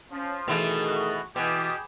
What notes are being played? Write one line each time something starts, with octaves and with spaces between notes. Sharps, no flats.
F3 C#4
B2 D#3 E3 A3 G#4
F#4
B2 E3 G4 G#4